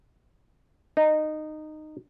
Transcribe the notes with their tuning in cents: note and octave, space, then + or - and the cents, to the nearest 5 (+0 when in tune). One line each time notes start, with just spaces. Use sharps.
D#4 -15